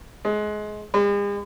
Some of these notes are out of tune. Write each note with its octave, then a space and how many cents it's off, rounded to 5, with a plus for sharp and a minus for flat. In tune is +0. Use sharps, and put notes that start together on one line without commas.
G#3 +25
G#3 -45